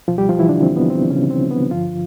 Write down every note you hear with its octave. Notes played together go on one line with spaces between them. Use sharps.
C#2 B2 F3 F4
G3 G4
F3 F4
E3 E4
D3 D4
C4
B3
C4
C#3 C#4
C4
B3
G2 D3 F3 F4